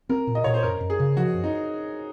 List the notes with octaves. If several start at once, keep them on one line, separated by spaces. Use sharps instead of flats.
C4 A#4
A#2
D#5
A#2 C#5
C5
F#2 A#4
F#2
G#4
C#3
F3 F#4
F#2
D#4